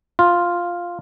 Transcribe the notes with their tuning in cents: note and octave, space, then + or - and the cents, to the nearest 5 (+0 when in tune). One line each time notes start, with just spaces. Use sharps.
F4 +0